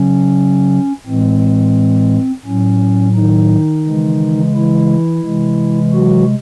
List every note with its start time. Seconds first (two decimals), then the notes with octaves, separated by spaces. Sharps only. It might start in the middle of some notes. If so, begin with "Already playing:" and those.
Already playing: C#3 F#3 C#4
1.07 A2 E3 G#3 C4
2.45 A2 F#3 C#4
3.15 D#3 D#4
3.85 C#3 E3 G#3
4.54 E3 E4
5.24 C3 E3 G#3
5.93 F#3 F#4